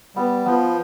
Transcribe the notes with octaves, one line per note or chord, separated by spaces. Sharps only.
G3 B3
F3 B3